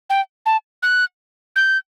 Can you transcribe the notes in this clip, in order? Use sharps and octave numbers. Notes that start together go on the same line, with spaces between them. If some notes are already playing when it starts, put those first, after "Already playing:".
G5
A5
F#6
G6